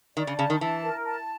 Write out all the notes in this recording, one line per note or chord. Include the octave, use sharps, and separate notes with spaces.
D#3 D5
C#3
C#3 A5
D#3
E3 A5
A#4
A5